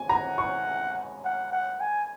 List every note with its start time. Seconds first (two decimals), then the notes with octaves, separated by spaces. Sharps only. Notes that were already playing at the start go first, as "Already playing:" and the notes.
Already playing: G#5
0.09 F#5 A#5
0.38 C#6
1.24 F#5
1.52 F#5
1.80 G#5